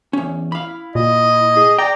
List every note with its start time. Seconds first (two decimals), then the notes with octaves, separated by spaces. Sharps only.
0.13 E2 C#4
0.52 E4 F5 B5
0.95 A#2 D#5
1.56 G#4
1.78 D5 G5 A#5